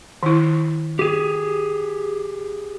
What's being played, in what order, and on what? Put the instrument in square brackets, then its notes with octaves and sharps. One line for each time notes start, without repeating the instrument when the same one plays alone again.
[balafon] D#3 E4
[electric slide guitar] G4 G#4